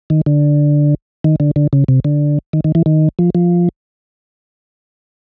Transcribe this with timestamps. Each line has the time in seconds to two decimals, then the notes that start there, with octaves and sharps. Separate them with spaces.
0.10 D#3
0.26 D3
1.24 D#3
1.40 D3
1.56 D3
1.73 C#3
1.88 C3
2.05 D3
2.53 D#3
2.64 D#3
2.75 E3
2.86 D#3
3.19 F3
3.35 F3